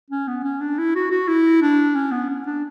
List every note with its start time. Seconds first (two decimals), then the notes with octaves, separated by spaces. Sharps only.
0.10 C#4
0.28 B3
0.44 C#4
0.60 D4
0.78 E4
0.95 F#4
1.11 F#4
1.28 E4
1.62 D4
1.95 C#4
2.11 B3
2.29 C#4
2.46 D4